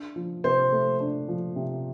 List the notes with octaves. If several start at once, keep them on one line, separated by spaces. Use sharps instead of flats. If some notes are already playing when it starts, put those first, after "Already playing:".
Already playing: D4
F3
C3 C5
A3
D4
F3
C3